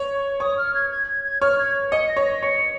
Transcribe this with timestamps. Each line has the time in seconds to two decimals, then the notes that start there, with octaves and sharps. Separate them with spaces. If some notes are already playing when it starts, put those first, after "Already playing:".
Already playing: C#5
0.14 C#6
0.40 C#5 D#6
0.58 F6
0.74 G#6
0.90 G#6
1.08 G#6
1.24 G#6
1.41 C#5 F6
1.58 G#6
1.92 D#5 C#7
2.09 A#6
2.17 C#5
2.25 A#6
2.43 C#5 C#7